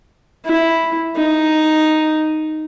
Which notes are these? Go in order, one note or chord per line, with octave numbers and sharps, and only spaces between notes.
E4
D#4